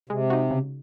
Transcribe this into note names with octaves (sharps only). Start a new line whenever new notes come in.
C3 G#3
D#4 F#4
C#3